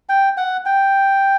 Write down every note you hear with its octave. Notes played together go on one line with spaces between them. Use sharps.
G5
F#5
G5